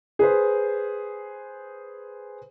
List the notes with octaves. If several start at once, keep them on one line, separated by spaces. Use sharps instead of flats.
G#4 B4 C5